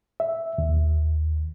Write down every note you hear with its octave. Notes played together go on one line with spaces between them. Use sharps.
E5
D#2